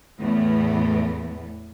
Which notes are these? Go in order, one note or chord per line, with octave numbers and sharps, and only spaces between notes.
E2 A2 E3 A3 B3